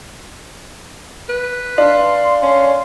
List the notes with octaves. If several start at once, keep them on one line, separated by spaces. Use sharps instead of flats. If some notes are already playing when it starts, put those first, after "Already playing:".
B4
D4 F5 C6
C#4